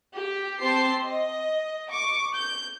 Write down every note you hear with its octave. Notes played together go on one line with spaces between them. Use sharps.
G4
C4 G4 C5 A5 C6 C7
D#5
C#6 D6
G6